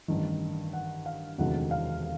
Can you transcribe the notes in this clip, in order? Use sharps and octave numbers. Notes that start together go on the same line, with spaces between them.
A1 G2 D#3
F#5
F5
E1 D2 C3 D#3 F#3 F#5
F5